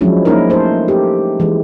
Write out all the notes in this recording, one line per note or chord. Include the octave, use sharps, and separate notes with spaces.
F3 F#3 G#3 C#4 D4 E4
G#3 A#3 C#4 D#4 E4 A#4
A3 A4 A#4 C5
G4
E3 G#3